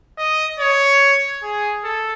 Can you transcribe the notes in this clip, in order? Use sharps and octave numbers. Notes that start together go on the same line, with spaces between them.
D#5
C#5
G#4
A4